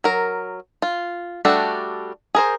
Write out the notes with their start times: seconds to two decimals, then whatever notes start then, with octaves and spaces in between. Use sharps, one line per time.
0.04 F#3 A#4
0.82 F4
1.45 G3 A3 D4 F#4 A4
2.35 G#4 A#4 C5